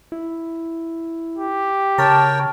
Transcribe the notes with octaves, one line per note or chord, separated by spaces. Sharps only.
E4
G4
C#3 A#4 C#5 G5 A5